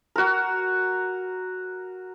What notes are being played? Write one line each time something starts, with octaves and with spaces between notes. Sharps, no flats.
F#4 A#4